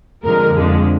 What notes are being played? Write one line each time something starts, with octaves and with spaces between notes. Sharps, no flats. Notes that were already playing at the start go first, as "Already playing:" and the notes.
F2 D3 G#3 A#4
F2 D3 F3 G#3